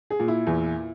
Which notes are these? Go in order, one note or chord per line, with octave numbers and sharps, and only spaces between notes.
G#4
A#2
E4
E2